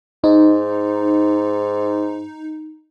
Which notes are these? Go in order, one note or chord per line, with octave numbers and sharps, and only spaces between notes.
G#2 D#4